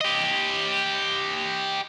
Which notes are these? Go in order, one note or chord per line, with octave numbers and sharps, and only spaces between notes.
G4 D#5